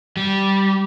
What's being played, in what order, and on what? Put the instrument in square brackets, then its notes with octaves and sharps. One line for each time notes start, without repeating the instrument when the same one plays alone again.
[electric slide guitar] G3